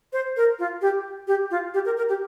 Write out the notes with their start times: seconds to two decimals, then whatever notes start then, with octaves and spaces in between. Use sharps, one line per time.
0.13 C5
0.37 A#4
0.59 F4
0.81 G4
1.27 G4
1.51 F4
1.74 G4
1.85 A#4
1.97 A#4
2.09 G4